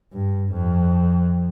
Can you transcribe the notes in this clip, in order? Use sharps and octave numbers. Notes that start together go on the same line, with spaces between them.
G2
F2